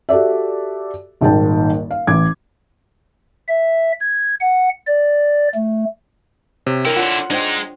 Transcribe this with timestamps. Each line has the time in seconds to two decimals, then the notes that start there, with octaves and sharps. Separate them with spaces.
0.09 F#4 G4 A4 D5 E5
1.21 D#1 G#1 D#2 G#2 G5 A5
1.91 F5
2.07 A1 D6 G#6
3.49 E5
4.00 G#6
4.40 F#5
4.87 D5
5.55 A3
6.67 C3 C#5
6.85 D3 E4 A#4 G5 E6
6.97 F4 C#5 D5 F#5
7.30 G#3 D4 D#4 C5 G5